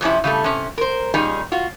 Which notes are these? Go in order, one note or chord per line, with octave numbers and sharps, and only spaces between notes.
F2 C3 C#4 E4
C#3 G3 A3
C3 C#4
A#4 C5
A#2 G3 C#4 D#4 G#4
F4 F#4